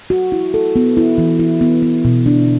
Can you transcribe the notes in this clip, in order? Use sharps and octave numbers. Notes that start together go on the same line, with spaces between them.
F#4
E4
A4
B3
E4
E3
E4
B3
B3
B2
D4